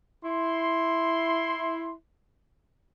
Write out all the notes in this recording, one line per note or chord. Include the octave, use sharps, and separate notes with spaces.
E4 C6